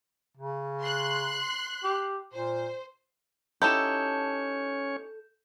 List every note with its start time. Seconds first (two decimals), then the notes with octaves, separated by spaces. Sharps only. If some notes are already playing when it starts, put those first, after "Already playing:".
0.37 C#3
0.82 C6 F#6
1.83 G4
2.34 A#2 C5
3.62 C#4 D#4 E4 G4 A4 C#5 G6 E7